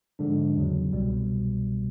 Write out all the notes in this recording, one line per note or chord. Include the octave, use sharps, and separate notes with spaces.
G#2 D3 F3 G#3 D4
E2 C#3 F#3
C2 B2 G3